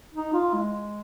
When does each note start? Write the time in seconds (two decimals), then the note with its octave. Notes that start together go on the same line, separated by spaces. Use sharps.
0.14 D#4
0.33 F4
0.54 G#3